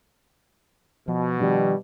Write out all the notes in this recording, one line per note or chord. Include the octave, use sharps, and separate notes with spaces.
B2 F3
D#3 F3 G3 D4